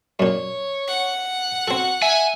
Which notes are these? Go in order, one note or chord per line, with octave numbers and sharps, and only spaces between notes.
F#2 A#2 C#5
F#5
C4 F#4 A4
E5 G#5